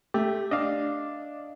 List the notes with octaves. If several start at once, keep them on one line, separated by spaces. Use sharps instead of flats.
A3 G4
D4 D#5 F5